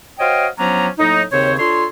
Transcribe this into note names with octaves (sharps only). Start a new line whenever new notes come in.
F#4 C5 C#5 D#5 F5 G5
F3 F#3 B3 C#4 D4 A#5
A2 F#3 A#3 D#4
D#2 C#3 C4 C5 C#5
D4 F4 A4 C#5 C6